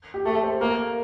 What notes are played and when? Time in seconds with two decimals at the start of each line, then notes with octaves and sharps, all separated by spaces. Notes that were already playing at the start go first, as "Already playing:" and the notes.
0.14 G4
0.25 A3 A4
0.44 C5
0.61 A#3 A#4